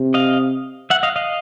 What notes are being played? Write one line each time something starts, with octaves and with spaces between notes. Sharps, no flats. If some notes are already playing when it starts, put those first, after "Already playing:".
Already playing: C3
D#5 F5
E5 F#5
D#5 F5
D#5 F5